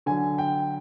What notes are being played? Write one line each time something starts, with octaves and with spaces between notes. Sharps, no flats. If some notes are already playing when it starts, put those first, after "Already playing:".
D3 F#3 G#5
G5